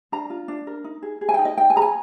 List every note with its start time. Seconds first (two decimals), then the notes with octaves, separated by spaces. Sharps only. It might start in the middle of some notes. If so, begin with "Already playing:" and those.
0.12 D4 A#5
0.30 F4
0.48 D4
0.67 A#4
0.84 D#4
1.03 G#4
1.21 G#4
1.29 G#5
1.34 D#4 G5
1.45 D#5
1.57 D#4 G5
1.70 G#5
1.76 G#4 A#5
1.82 G#5